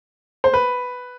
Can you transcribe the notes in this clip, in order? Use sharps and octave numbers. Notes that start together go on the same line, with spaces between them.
C5
B4